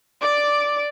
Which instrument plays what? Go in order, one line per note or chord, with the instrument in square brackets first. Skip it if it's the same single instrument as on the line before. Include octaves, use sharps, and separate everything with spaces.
[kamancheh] D5 D6